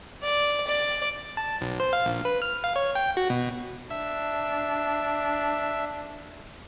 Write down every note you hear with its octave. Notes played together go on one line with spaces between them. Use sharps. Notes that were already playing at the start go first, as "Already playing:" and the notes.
D5
D5
A5
B1
C5
F5
A#1
B4
F6
F5
C#5
G5
F#4
B2
D4 E5